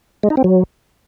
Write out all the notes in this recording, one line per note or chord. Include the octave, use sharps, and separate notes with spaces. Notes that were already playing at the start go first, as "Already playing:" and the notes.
G#3
D#4
C4
F#3